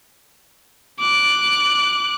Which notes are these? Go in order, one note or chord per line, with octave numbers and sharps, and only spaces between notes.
D6 F#6